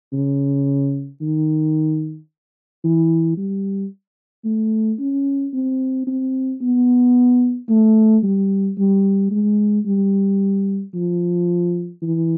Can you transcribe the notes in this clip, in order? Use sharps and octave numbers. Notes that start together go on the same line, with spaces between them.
C#3
D#3
E3
G3
A3
C#4
C4
C4
B3
A3
G3
G3
G#3
G3
F3
E3